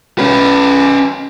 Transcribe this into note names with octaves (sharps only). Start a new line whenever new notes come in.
C#4 B4